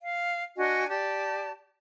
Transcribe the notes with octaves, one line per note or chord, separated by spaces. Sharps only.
F5
D4 F#4 D#5 G#5
G4 D5 A5